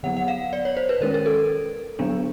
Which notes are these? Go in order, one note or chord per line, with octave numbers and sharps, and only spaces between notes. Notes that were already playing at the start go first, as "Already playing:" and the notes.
D3 F#3 B3 F#5
F#5
F5
D5
C#5
C5
B4
D#3 G#3 C#4 A#4
A#4
A4
D3 F#3 B3 D4